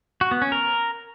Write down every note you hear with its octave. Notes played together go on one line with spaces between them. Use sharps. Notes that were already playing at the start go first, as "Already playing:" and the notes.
F#4
B3
C#4
A#4